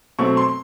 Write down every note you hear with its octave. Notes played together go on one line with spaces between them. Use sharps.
B2 F#3 A3 C4 C#6
C6